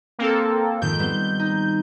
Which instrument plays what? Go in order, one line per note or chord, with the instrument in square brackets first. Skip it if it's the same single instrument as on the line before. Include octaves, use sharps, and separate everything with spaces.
[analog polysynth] A#3 C4 A4
[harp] F2 G#2 D#3 [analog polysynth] G6
[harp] G3 B3 C4
D#4